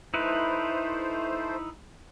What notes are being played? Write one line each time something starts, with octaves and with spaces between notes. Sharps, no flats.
A3 D#4 E4 B4 C5